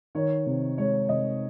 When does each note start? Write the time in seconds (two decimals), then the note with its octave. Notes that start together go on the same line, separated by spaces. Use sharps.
0.15 D#3 C#5
0.46 C3
0.78 G#3 C#5
1.09 C3 D#5